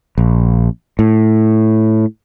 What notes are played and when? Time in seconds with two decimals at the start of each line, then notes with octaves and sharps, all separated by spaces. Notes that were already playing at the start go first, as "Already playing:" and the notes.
0.18 A#1
0.99 A2